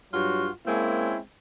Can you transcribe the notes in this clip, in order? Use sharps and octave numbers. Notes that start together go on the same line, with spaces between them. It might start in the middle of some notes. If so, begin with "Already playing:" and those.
G2 F#3 F4 F#4
G#3 A#3 C4 C#4 E4